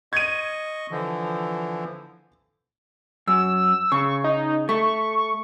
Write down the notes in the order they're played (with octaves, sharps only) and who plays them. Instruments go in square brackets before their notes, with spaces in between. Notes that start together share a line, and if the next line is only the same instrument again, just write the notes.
[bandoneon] D#5 C#6 [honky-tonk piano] G#6 D#7
[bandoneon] D3 E3 F3
[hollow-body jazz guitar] F#2 [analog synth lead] E6
[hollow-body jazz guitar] C#3 [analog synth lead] C#6
[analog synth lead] D#4
[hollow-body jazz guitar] A3 [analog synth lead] C#6